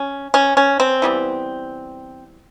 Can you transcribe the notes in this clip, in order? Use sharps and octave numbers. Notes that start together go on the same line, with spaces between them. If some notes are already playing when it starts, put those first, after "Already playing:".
Already playing: C#4
C#4
C#4
C4
E3 G3 B3